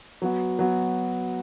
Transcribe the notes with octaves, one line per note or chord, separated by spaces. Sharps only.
F#3 B3 F#4
F#3 B3 F#4